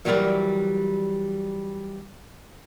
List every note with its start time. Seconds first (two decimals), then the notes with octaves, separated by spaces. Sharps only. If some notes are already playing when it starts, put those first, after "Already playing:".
0.05 E3 F#3 G3 F4 A#4 D5